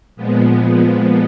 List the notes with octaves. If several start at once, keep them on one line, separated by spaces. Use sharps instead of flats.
A#2 F3 G#3 B3